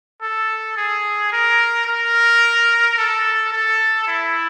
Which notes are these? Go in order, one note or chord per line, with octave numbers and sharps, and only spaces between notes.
A4
G#4
A#4
A#4
A4
A4
E4